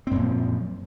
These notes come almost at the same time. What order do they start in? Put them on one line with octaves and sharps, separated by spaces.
C4 F#2 A#2 F3